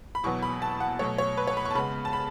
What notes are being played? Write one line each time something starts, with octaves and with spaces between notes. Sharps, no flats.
B5
E2 B2 F#3 B3 C#6
B5
A5
F#5
B2 F#3 A3 C#5
C#5
B4
C#5
B5
C#6
A5
C#3 G#3 B3 B5
A5
B5